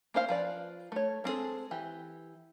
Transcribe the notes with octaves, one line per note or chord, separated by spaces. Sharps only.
A#3 C#4 C5 F5
F3 B4 D5
A3 C#5
G#3 C4 C#4 G#4 A4
E3 G4